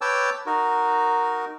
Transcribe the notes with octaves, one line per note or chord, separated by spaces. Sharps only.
B4 C#5 G5 A5 D6 E6
D#4 F#4 A#4